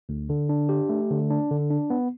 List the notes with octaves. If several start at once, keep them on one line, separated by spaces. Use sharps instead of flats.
D2
D3
D4
G4
A3
D3
D4
D3
D4
B3